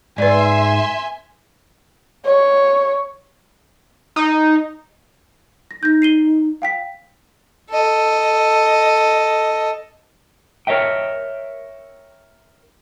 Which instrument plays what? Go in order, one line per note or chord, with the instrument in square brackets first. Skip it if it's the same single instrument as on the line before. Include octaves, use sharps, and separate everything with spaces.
[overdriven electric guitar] G#2 [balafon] B4 D5 [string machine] E5 C6 [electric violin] G#5
[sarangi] C#5
[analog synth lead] D#4
[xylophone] A#6
[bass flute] D#4 [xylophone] G6 A#6
[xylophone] C7 D#7 G7
F5 G5 B6
[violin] A4 D#5
[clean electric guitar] A#4 C#5 D#5 E5 G5